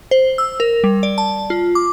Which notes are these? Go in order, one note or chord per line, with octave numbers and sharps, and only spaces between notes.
C5
E6
A#4
G3
D5
A5
F4
D6